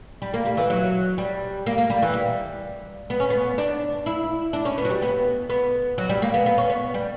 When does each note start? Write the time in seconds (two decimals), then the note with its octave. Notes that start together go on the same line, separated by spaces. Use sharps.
0.22 G3
0.34 A#3
0.45 G3
0.57 E3
0.70 F#3
1.18 G3
1.66 A#3
1.78 A#3
1.90 G3
2.02 E3
2.14 G3
3.10 B3
3.20 C#4
3.30 B3
3.58 D4
4.06 E4
4.53 D4
4.65 C#4
4.78 B3
4.85 F#3
4.90 G3
5.02 B3
5.50 B3
5.98 F#3
6.09 G3
6.22 A#3
6.34 B3
6.46 B3
6.58 C#4
6.70 B3
6.94 G3